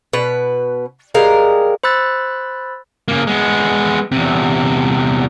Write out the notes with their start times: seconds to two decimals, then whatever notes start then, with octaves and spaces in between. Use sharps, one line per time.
0.13 B2 B4
1.14 G3 G#3 A#4 F5
1.83 C5 B5 E6 F#6 A6
3.08 C#3 A#3
3.27 G#3 B3
4.12 E2 C3